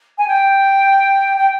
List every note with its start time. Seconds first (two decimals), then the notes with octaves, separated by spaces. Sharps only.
0.18 G#5
0.27 G5
1.37 G5